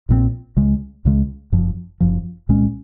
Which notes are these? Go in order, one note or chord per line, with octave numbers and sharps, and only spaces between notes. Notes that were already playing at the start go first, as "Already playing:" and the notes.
A#1 A#2 F3 C4
C#2 C#3 G#3
C#2 C#3 G#3
F#1 F#2 F3
F#1 F#2 F3
C2 A#2 G#3 C#4